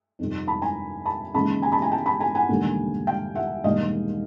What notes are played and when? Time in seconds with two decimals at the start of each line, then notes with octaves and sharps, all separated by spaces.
0.19 F2 C3 D#3 G3 C4
0.47 A5 B5
0.62 G#5 A#5
1.06 A5 B5
1.34 D#2 C#3 E3 G#3 C#4 A5 B5
1.62 G#5 A#5
1.72 A5 B5
1.82 G#5 A#5
1.91 G5 A5
2.06 A5 B5
2.20 G#5 A#5
2.35 F#5 G#5
2.49 E1 D#2 D3 G3 A#3
3.07 F5 G5
3.35 E5 F#5
3.63 E1 D#2 D#3 G3 D#5 F5